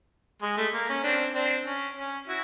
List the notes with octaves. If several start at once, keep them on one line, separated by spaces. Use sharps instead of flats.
G#3
A3
A#3
C#4
C4 D4
C4 D4
C#4
C#4
E4 F#4